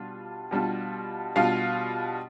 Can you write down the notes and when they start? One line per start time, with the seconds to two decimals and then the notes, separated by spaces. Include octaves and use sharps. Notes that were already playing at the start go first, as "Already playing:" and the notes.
Already playing: B2 G3 D4 F4
0.51 B2 G3 D4 F4
1.36 B2 G3 D4 F4 F5